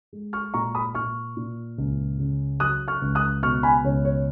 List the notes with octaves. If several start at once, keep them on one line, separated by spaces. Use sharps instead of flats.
G#3
C#6 F6
A#2 A#5 C#6
B5 D#6
A#2 C#6 F6
A#2
C#2
C#3
F#3 D#6 F#6
C#6 F6
C#2
D#6 F#6
B2 C#6 F6
G#5 B5
C#2 C#5
C#5